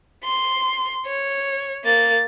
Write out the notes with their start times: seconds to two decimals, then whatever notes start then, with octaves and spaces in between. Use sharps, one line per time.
0.24 C6
1.06 C#5
1.84 A#3 A6